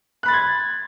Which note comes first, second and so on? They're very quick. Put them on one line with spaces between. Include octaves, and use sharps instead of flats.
F#6 B5 A6 C6 G#6